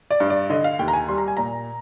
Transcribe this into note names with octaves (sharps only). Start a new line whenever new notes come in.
D5
G2
D5
D3 D#5
F5
D#2 G5
A#5
G#5
G3 C6
A#5
G#5
A#2 A#5